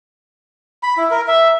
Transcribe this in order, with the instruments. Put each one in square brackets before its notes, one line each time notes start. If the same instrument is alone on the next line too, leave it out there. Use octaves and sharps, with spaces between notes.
[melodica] B5
E4
A#4
E5